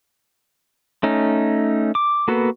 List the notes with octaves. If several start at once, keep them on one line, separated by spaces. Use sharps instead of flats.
A3 C#4 D#4
D6
A#3 B3 F#4 A4 B4